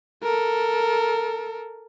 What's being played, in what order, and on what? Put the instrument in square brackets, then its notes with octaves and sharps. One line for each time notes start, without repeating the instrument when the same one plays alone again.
[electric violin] A4 A#4